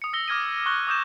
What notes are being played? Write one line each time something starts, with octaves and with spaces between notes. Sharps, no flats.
D#6 C#7
E6 A#6 G7
D6 F6 G#6 A#6 D#7
C#6 F#6 G7
D6 D#6 G6 E7